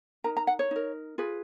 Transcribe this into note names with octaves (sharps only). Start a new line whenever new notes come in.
D#4 A#4 A#5
A#5
F#5
C#5
D#4 A#4
F4 G#4 B4